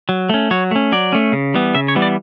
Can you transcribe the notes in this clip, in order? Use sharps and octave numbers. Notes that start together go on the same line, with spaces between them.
F#3
A3 C#4
F#3 C#5
A3 C#4
F#3 D5
A3 C#4
C#3
E3 G3 B3
C#3 E5
C#5
E3 G3 B3
D5